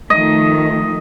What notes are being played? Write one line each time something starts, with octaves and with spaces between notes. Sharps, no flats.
D#3 F3 A3 D#5